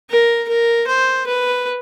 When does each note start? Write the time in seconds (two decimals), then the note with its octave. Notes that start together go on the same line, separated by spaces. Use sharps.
0.10 A#4
0.48 A#4
0.87 C5
1.27 B4